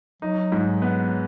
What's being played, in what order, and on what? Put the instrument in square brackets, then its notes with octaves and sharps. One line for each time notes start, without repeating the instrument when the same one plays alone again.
[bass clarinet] F#3 [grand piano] D#4
[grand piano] G#2
B3